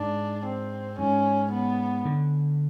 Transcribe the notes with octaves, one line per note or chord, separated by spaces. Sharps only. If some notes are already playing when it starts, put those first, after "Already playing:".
Already playing: G#2 D4
C4
G#2 C#4
B3
D3